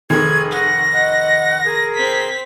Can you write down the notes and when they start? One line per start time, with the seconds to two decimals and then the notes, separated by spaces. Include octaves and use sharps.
0.10 F1 D#3 G#4 G#6
0.51 F#5 A#6
0.93 D#5 F#5
1.65 G#4 A#4
1.95 C4 B6